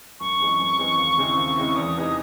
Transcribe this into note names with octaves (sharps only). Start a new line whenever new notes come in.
F#2 C#6
E3 G#3 C4
F#2
E3 G#3 C4
D#2
C#3 G#3 C4 E4
D#2
C#3 G#3 C4 E4
E2 D#6
C3 E3 G#3 D#4